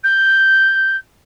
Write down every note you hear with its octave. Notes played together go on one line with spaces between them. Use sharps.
G6